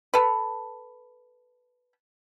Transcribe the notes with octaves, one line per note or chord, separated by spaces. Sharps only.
A4 B4